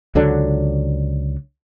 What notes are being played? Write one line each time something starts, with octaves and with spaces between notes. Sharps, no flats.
C#2 D3 F#3 D4